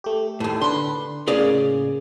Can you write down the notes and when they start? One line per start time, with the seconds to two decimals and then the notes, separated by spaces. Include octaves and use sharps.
0.04 A3 G4
0.40 D#2 A2
0.61 D3 D4 B4 C6
1.28 A2 C#3 A#3 G#4 C#5 D5